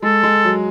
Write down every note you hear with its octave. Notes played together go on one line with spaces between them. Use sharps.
G#3 A4
G#3
F#3